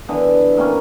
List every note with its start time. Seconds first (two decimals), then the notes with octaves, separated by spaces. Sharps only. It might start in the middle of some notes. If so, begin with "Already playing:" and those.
0.08 D3 E3 B3
0.57 C3 A#3 B3 C#4